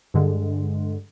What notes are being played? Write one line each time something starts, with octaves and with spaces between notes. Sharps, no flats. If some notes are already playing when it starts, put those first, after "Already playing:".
G2 D3 G#3